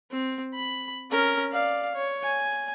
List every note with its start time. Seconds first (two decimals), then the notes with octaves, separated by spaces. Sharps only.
0.12 C4
0.55 B5
1.11 C#4 A#4
1.52 D5 F5
1.94 C#5
2.24 G#5